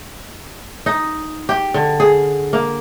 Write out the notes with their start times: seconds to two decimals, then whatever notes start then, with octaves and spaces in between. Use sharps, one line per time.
0.86 D#4
1.49 G4
1.74 D3
2.00 G#4
2.53 A#3